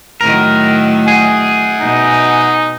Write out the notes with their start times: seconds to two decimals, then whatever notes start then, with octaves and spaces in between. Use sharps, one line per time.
0.21 A2 D#3 F#3 A#4
1.08 G#4 F#5 G#5
1.82 B2 D#4